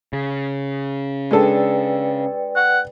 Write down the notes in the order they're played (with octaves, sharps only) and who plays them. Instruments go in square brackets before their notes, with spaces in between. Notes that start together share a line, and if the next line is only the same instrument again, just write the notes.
[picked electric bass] C#3
[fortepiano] G#3 D4 A4 [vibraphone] B4 D5 G5
[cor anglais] F#5